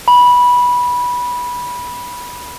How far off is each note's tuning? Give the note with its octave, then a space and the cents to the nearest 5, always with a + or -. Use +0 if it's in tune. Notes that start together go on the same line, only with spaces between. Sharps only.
B5 -15